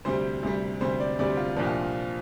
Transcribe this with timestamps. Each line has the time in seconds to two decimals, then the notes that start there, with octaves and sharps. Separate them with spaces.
0.05 D2 C3 G3 C5
0.43 D2 C3 G3
0.81 D2 C3 G3 C5
1.00 D5
1.19 D2 C3 G3 D5
1.37 F4
1.56 C2 A#2 F3 D4
1.66 F4